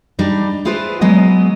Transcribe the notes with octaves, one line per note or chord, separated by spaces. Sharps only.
G3 D4 D#4
E4 F4 G#4 B4 C5
F#3 G#3 B3 D#5